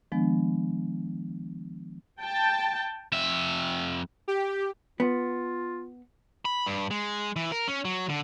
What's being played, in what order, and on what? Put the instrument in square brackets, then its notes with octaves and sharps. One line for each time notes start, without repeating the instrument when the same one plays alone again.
[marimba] D#3 F3 G#3 B3 D4
[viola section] G5 A5
[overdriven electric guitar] F2 E5
[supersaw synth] G4
[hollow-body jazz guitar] B3 [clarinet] F4
[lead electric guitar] B5
G2
G#3
E3
A#4
C#4
F#3
D3